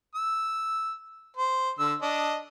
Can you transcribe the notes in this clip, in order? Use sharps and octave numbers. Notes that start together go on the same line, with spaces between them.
E6
C5
D3 E6
D4 D#5